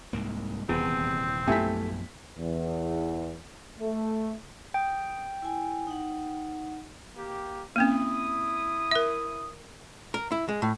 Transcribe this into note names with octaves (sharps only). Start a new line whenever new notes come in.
C2 G#2 A#3
D#1 E2 C3 E3 C4
A#1 F#2 A3 B3 E4 G4 G#5 B6
E2
A3
G5 D#6
E4 G#5
D#4 F#5
A#3 G4
A#3 C4 C#4 E4 D#6
A#4 E5
A#4
E4
G#3
A2